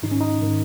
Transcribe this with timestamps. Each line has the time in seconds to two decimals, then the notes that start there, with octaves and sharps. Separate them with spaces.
0.03 G#2 D#3 D#4
0.11 C#4
0.21 D#4
0.39 G#2 D#3